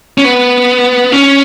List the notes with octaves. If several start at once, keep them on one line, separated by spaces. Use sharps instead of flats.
C#4
B3
C#4